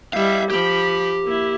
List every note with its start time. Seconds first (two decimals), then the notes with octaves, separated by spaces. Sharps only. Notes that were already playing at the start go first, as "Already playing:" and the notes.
0.13 G3 E4 E5 F5
0.50 F3 G4 B5
1.24 A#3 E4